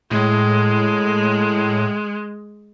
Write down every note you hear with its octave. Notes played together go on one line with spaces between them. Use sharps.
A2 G#3